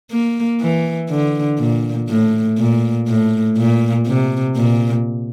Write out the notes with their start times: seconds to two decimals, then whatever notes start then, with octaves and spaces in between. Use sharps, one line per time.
0.11 A#3
0.61 E3
1.10 D3
1.59 A#2
2.09 A2
2.59 A#2
3.08 A2
3.58 A#2
4.07 C3
4.56 A#2